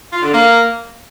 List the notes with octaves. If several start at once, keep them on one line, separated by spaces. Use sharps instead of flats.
F4
D3
A#3